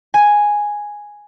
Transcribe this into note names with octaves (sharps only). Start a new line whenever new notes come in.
G#5